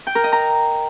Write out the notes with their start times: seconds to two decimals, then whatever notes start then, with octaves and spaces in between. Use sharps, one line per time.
0.07 G5
0.15 A#4
0.24 D#5
0.32 A#5